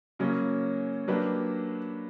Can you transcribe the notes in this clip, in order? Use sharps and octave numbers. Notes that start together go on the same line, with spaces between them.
C#3 F#3 A#3 C#4
F#3 A#3 D4 G4 B4